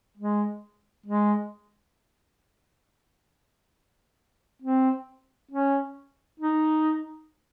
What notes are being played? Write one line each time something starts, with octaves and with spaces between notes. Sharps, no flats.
G#3
G#3
C4
C#4
D#4